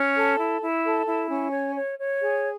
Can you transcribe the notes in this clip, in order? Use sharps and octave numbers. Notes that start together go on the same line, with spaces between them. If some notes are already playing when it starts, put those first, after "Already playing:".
Already playing: C#4
A4
E4
E4
A4
E4
C#4
C#5
C#5
C#5
G#4